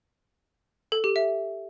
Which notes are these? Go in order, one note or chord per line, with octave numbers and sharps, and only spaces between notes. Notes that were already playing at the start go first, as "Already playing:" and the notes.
A4
G4
E5